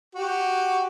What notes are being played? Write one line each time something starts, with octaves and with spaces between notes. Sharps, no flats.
F#4 G4